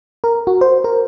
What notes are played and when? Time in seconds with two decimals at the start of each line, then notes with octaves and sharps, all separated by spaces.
0.24 A#4
0.47 F#4
0.61 C5
0.84 A#4